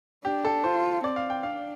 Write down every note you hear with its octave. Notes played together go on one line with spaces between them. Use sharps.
D4 G4
A4
F4 C5
C4 D5
F5
G5
D4 F5